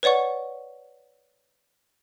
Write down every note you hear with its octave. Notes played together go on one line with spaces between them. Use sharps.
B4 C#5 D5 F#5 C#6